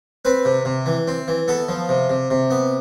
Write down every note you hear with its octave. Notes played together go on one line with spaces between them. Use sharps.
C4 B4
C3
C3
E3
C4
E3
B3 A4
F3
C3
C3
C3
B3